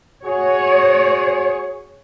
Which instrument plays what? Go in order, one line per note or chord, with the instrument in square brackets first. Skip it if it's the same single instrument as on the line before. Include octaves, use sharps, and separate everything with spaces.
[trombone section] F#4 G#4 [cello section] C#5